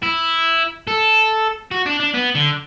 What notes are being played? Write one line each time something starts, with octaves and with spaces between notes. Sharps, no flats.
E4
A4
F#4
D4
D4
B3
D3